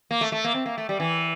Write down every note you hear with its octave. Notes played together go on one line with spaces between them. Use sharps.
A#3
A3
A3
A#3
C4
A#3
A3
G3
E3